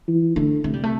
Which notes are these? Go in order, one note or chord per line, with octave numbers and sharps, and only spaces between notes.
E3
D3 A3
C3 A3
G3
A3